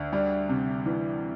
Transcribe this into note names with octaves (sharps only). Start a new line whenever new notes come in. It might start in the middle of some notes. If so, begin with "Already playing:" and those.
Already playing: D2
G3
C3
E3